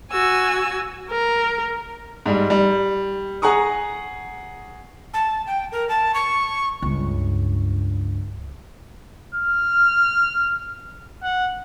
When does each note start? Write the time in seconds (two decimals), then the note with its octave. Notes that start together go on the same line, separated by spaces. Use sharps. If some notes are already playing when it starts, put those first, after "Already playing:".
0.12 F#4 G#5 E6
1.11 A#4
2.26 G#2 G3
2.50 G3
3.42 G#4 F#5 A#5 C#6 D#6
5.14 A5
5.47 G5
5.72 A#4
5.89 A5
6.14 C#6
6.82 C#2 G2
9.35 F6
11.23 F#5